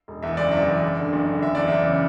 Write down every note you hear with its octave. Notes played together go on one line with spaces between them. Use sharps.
E1
E2 E5
F#1 D5
E2 E5
E2
F#1
D3
F#1
D3
F#1 E5
E2 D5
E2 E5
C#3